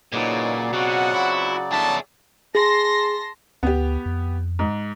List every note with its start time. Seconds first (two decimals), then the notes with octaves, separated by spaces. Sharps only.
0.13 A#2 C#3 E3 F#3 G#3 D#4 D5
0.73 B2 C4 F4 F#4 F#5
1.14 E4
1.72 F#2 A2 D4 G#4 E5 A5
2.55 G#4 A5 C6 A#6
3.63 D2 B3 G4
4.06 F2
4.59 G#2